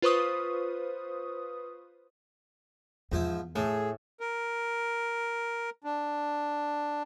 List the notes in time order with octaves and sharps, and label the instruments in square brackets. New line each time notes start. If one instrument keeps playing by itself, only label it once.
[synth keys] F4 B4 C5 C#6 D#6
[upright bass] E2 [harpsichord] G#2 F3 E4
[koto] A2 [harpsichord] A3 [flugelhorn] G#4
[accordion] A#4
D4